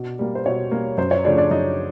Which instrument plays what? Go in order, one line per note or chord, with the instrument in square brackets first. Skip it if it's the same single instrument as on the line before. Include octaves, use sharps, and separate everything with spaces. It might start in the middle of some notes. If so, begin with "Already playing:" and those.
Already playing: [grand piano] B2 D4
G3 A#3
C5
B2 C#5
G3 A#3
F#2 C5
C#5
C#3 F3 A3 C#4 D4 D5
D4 D5
F#2 D#4 D#5